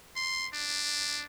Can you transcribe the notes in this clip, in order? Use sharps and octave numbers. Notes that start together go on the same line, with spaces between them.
C6
D4